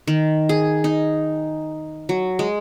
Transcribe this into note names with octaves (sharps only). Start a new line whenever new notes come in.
D#3
G#4
D#4
F#3
G#3